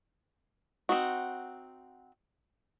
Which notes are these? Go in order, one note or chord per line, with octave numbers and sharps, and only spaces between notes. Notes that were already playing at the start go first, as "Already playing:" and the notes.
C4 D#4 F#4